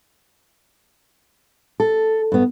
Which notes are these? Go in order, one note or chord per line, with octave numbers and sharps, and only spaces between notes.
A4
G2 B3